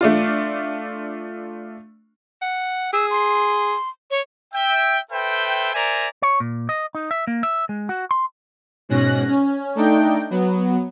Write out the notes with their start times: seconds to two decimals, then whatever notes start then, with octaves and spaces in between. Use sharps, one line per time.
0.01 A3 D4 F4
2.42 F#5
2.93 G#4 E6
3.10 C6
4.11 C#5
4.54 E5 G5
5.12 A4 B4 C5 E5 G5
5.74 A#4 C5 D5 E5 G#5 A#5
6.22 C#5
6.40 A#2
6.69 D#5
6.95 D#4
7.11 E5
7.27 A#3
7.43 E5
7.69 G#3
7.89 F#4
8.11 C6
8.89 G#2 B2 C#4 F#6 A#6
9.28 C#4
9.75 A3 D4 D#4 G5
10.30 F#3 B3